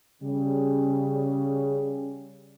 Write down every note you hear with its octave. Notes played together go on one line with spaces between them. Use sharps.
C#3 G3